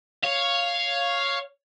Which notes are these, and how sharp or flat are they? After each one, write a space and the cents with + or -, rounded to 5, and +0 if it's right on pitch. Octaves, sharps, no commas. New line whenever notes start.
C#5 +0 F5 +0